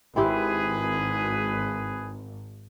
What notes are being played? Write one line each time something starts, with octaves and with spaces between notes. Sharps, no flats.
G#1 C4 E4 G4 G#4 B4